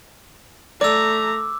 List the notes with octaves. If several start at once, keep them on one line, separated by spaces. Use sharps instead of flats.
A3 D5 A#5 D6 E6